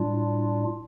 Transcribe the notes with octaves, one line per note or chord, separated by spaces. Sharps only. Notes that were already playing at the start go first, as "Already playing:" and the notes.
Already playing: A2 G3 D4 F4